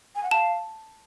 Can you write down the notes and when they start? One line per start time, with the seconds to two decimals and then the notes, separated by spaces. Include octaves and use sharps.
0.15 G#5
0.23 F#5
0.31 F5 A5